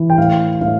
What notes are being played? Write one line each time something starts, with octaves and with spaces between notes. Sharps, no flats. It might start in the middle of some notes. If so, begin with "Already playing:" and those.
Already playing: E3
G5
A2 F5
A2 F5